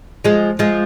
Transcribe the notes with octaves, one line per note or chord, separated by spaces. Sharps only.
F3 G#3
F3 G#3